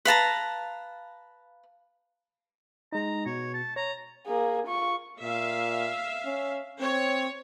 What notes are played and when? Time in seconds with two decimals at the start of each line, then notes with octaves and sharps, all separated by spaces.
0.05 B4 F5 A5 A#5
2.92 G#3 D#4 A#5
3.26 B2 C#5
3.54 A5
3.76 C#5 A#5
4.27 A#3 G#4
4.67 F4 C#6
5.22 A#2 E5 F5
6.26 C#4
6.81 C4 C#5